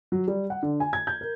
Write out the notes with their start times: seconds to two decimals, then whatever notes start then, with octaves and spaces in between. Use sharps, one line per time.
0.12 F#3
0.28 G3
0.50 F#5
0.63 D3
0.80 G#5
0.93 G#6
1.07 G6
1.21 A#4